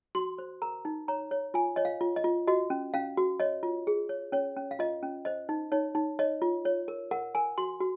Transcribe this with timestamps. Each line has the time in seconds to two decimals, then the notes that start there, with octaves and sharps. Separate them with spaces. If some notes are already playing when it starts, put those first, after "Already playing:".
0.15 F#4 C6
0.38 C5
0.62 A#4 A#5
0.85 D#4
1.08 C#5 A#5
1.31 C#5
1.54 F4 G#5
1.76 C#5 D#5
1.85 F5
2.01 F4
2.16 D#5
2.24 F4
2.47 F#4 D#5
2.70 C#4
2.94 C#4 F5
3.17 F#4
3.40 C#5 D#5
3.63 F4
3.87 G#4
4.09 C#5
4.32 C#4 C#5
4.56 C#4
4.71 F5
4.79 F4 D#5
5.02 C#4
5.25 C5 D#5
5.49 D#4
5.72 D#4 C#5
5.95 D#4
6.19 C#5 D#5
6.42 F4
6.65 C#5
6.88 A#4
7.11 A#4 F#5
7.35 A#4 G#5
7.58 F#4 C6
7.80 F#4